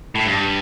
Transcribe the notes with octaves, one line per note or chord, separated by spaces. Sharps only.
A2
G2